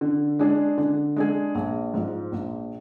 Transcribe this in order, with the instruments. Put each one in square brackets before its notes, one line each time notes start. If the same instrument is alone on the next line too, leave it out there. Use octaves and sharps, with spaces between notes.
[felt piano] D3
G#3 D4 G#4
D3
G#3 D4 G#4
A#1
G#2 F3
A#1